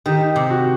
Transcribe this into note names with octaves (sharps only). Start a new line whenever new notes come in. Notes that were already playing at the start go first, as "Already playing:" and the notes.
D#3 G4
C3
F#4